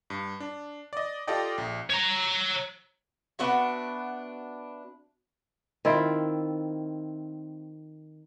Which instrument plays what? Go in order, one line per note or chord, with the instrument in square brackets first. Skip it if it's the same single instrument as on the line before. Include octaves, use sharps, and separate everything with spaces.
[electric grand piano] G2
D4
D5 D#5
F4 G4 A4 D5 D#5 G5
A#1
[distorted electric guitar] C#5 A#5
[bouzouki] B3 D4 F#4 E5
[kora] D#3 C4 E4 F4